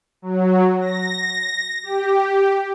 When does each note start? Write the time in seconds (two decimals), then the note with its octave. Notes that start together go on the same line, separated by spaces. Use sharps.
0.22 F#3
0.80 A#6
1.83 G4